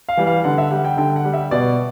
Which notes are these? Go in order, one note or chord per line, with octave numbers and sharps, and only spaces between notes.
F5
E3 G3
F5
D3 F#5
E5
G3 F#5
G5
D3 G5
F#5
G3
E5
B2 D5